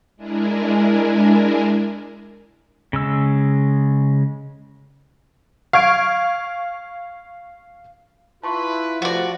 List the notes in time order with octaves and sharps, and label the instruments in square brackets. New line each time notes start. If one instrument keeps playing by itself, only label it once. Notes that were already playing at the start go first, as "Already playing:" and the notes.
[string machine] G#3 D4 E4 G#4 A#4
[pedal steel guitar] C#3 G#3 E6
[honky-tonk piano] F5 C#6 G#6 D7
[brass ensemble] E4 F4 B4 [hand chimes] A5 C6 C#6
[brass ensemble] C3 A3 [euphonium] F3 [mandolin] F#4 D5 [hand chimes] F#5